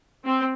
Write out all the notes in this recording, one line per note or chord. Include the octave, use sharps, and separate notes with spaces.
C4